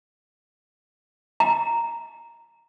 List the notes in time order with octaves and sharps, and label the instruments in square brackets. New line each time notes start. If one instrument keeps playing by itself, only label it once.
[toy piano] A#5